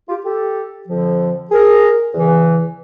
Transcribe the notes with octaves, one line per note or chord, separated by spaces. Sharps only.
F4 G4
G4 A4
F2 D3 F3
G#4 A#4
E2 C#3 E3